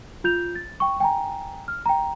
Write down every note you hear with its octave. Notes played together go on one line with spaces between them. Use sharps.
F4 G6 F7
A6
G5 C#6
G5 G#5 A#5
F6
G5 A#5